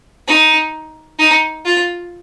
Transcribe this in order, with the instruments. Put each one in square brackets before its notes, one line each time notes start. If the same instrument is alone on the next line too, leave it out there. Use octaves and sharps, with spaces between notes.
[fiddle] D#4
D#4
F4